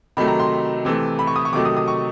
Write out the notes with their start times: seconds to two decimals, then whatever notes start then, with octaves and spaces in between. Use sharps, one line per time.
0.17 C3 D#3 F#3 A3 B5
0.28 A#5
0.40 C6
0.85 C3 E3 A3
1.19 B5
1.27 C#6
1.36 D#6
1.45 C#6
1.53 C3 D#3 F#3 A3 D6
1.65 D#6
1.77 D#6
1.88 C#6